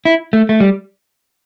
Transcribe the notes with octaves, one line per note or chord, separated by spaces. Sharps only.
E4
A3
A3
G3